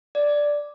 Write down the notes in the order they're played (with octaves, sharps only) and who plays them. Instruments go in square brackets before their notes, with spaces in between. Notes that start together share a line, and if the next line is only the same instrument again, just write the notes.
[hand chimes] D5